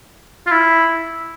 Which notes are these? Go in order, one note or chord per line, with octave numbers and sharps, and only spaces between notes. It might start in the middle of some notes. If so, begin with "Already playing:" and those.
F4
E4